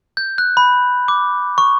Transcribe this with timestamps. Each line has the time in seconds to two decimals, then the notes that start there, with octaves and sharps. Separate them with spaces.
0.17 G6
0.38 F#6
0.57 B5
1.08 D6
1.58 C#6